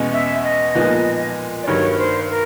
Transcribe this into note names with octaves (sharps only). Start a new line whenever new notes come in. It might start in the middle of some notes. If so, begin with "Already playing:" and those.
Already playing: E2 B2 G#3 C#4
E5
D#5
A#2 F3 G#3 B3 D#4
D5
G2 D#3 F#3 C#5
C#5
C5
A#4